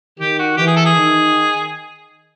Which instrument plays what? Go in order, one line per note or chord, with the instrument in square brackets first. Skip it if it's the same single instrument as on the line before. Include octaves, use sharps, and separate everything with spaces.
[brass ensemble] D#3 [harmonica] G4
[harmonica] F#4
[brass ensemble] E3 [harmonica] G4
[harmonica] G#4
A4
G#4
[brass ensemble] D#3